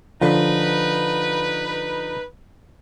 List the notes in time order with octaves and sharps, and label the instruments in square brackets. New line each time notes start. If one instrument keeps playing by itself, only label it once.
[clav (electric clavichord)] D3 F3 [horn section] D#4 B4